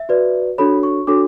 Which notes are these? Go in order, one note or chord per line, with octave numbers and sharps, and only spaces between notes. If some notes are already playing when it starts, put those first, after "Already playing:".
Already playing: E5
F#4 B4 D5
D4 F#4 A4 C#5 B5
C#6
D4 F#4 A4 C#5 D6